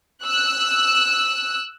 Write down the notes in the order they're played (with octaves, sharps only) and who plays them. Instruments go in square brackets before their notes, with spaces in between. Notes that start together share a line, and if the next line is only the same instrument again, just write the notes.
[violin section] E6 F#6